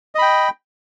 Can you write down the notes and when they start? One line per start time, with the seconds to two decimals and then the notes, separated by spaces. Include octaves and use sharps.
0.15 D#5
0.18 B5
0.22 G5